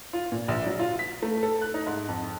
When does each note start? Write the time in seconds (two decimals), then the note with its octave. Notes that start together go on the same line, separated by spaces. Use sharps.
0.13 F4
0.32 A#2
0.48 A#1
0.66 F#3
0.80 F4
0.99 B6
1.22 A3
1.43 A4
1.61 F#6
1.74 D#4
1.87 G#2
2.08 F2